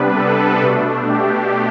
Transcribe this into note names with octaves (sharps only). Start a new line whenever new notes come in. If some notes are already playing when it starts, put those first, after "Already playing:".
Already playing: C3 G3 B3 D4 B4
A4
B2 A3 D4
G4